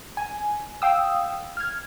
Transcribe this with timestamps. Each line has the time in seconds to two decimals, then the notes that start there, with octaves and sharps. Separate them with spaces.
0.17 G#5
0.82 F5 G5 D#6 E6
1.57 F6 G#6